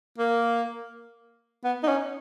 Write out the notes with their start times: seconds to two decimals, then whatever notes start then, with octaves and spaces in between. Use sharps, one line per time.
0.18 A#3
1.64 B3
1.83 D#4
1.88 C#4